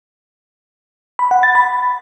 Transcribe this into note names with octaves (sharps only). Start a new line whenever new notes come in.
B5
F#5
A6
B5